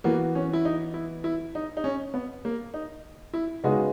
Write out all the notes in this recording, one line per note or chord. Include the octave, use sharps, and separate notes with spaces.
E3 A#3 B3 F#4
C#4
E4
D#4
E4
E4
D#4
D#4
C#4
B3
A#3
D#4
E4
C#3 G#3 B3 D#4 F#4 G#4